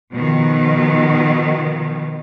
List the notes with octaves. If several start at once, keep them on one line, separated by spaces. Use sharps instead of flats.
B2 D#3 F3